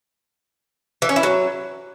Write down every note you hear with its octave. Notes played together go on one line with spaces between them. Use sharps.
E3
C#4
E4
F#3